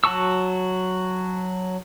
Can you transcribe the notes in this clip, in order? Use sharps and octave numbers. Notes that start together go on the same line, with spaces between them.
F#3 F#4 A5 C#6 E6